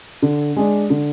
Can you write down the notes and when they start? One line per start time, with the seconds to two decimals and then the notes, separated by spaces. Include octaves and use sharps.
0.22 D3
0.56 G#3 D4
0.90 D3